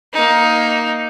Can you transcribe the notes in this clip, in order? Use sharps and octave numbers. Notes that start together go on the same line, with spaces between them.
A#3 D#4